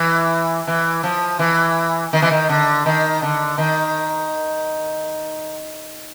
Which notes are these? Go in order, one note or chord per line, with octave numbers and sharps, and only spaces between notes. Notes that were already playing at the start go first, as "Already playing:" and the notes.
Already playing: E3
E3
F3
E3
D#3
E3
D#3
D3
D#3
D3
D#3